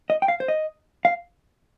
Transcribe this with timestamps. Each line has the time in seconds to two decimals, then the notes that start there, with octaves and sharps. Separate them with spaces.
0.10 D#5
0.22 G5
0.28 F5
0.40 C5
0.48 D#5
1.05 F5